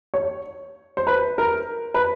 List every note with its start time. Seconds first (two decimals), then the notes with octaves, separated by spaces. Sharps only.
0.14 C#5
0.97 C5
1.07 B4
1.38 A#4
1.94 B4